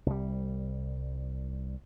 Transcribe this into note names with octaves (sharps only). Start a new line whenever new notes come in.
C2 G3